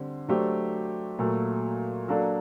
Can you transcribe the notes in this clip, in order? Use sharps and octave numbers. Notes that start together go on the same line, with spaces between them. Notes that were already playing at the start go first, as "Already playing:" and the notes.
Already playing: D3 G3 C4
F#3 A3 D4 G4 C5
A#2 F#3 A3
F#3 A#3 D4 A4